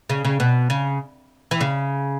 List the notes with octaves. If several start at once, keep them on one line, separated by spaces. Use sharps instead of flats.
C#3
C#3
B2
C#3
E3
C#3